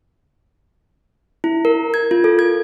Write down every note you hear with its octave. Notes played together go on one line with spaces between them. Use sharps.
E4
A#4
G#6
F4
A4
G#6